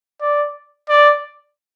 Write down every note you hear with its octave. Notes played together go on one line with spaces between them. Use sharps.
D5
D5